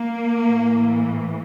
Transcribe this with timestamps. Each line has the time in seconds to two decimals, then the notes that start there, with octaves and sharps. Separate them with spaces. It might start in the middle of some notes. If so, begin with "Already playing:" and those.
Already playing: A#3
0.46 A2 E3